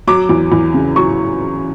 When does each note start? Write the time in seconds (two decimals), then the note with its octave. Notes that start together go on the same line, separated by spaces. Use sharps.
0.07 F#3 D6
0.29 E2
0.52 E2
0.74 C#3
0.96 F#3 C#6